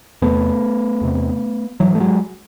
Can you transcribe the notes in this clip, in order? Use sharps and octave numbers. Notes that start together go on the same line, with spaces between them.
E2 C3 A3 B3
E2 C3
G#2 E3 F#3
A3
F#3 G#3